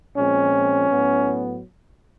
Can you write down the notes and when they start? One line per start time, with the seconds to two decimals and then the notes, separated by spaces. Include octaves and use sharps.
0.17 A#2 F3 G#3 C4 C#4
0.90 A2 F#3 B3